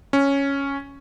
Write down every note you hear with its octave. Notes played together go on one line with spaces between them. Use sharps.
C#4